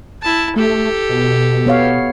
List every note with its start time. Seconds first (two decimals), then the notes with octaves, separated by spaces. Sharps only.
0.22 E4 A5
0.56 A3 G4 A4
1.09 B2
1.66 B3 C#5 F5